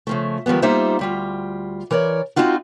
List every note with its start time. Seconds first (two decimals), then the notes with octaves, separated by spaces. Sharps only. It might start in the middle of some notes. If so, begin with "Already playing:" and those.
0.07 C#3 F3 A3
0.46 D#3 F3 G3 G#3 B3
0.62 G3 A#3 D#4 F4 C5 E5
0.99 D2 G3 F4
1.91 E3 A#4 C#5 D5
2.36 G#3 A3 C4 D#4 F4 F#4